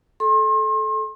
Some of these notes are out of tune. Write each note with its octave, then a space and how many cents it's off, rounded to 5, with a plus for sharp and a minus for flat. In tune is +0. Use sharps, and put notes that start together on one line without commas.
A4 -20 C6 +40